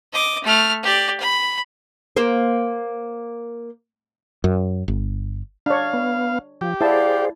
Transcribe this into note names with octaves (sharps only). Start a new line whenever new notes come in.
D#5 D6
A3 F6
G4 D5
B5
A#3 C5
F#2
G1
D4 C#5 F5
B3
F3 G4
E4 G#4 C5 D5 F5 F#5 A5